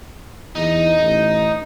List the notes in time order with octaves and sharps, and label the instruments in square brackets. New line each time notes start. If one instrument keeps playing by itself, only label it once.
[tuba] E2 [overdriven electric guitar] D#4
[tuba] A1